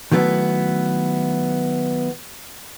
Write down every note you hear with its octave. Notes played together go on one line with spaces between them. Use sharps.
D#3 F#3 A3 B3 E4